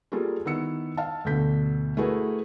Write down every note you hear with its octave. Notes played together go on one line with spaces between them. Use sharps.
G3 A#3 F4 G#4 A4
D#3 B3 E4 E6 C#7
F5 A5
D2 B2 D3 A4 G6 B6
A3 E4 F#4 G#4 A#4 B4